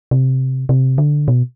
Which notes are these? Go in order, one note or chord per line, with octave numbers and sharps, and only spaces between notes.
C3
C3
D3
B2